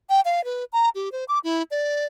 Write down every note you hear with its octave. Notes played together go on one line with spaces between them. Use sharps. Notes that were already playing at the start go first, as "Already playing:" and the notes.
G5
F5
B4
A#5
G4
C5
D6
E4
D5